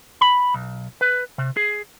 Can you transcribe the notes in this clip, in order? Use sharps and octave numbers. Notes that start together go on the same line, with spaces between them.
B5
B1
B4
C3
G#4